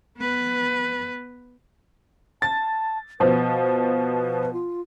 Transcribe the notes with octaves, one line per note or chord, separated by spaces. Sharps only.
B3 B4
A5 A6
B2 F3 B4
B4
F4